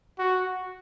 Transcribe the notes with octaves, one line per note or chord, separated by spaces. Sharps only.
F#4